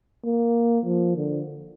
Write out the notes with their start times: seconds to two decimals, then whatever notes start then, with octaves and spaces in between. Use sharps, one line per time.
0.25 A#3
0.85 F3
1.17 D3